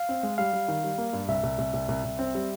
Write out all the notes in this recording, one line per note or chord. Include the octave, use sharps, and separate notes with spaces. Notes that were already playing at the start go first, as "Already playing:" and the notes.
Already playing: F5
C4
G#3
G3 F5
G3
D#3
G3
A#3
G2
C2 E5
C2
C2
C2
C2
C2
C4
G3